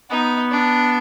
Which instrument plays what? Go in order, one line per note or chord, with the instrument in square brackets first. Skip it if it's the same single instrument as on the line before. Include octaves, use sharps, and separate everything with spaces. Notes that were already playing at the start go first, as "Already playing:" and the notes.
[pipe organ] B3 [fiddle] D#4
[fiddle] D4